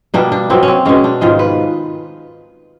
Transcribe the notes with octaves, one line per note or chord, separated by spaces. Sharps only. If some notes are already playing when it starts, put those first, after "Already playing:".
B2 G3 A#3 D4
D4
B2 F#3 A#3 C4
C#4
C4
B2 G#3 C#4
D4
G#2 D#3 G#3 F4
B4